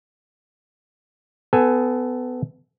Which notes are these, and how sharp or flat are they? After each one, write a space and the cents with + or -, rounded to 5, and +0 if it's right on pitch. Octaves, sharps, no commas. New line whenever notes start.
B3 +25 A4 +0 G#5 +0